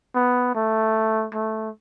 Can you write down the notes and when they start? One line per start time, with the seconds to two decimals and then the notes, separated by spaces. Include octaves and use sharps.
0.15 B3
0.55 A3
1.34 A3